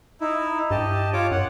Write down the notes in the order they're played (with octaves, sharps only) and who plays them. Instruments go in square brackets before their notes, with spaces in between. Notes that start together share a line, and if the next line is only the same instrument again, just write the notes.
[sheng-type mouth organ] D#4 E4
[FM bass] G2 [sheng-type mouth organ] G4 D#5 A5
[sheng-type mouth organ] F4 C#5 D6
[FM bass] F#2 [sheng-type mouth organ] F#5